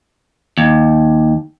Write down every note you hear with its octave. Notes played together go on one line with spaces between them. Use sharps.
D#2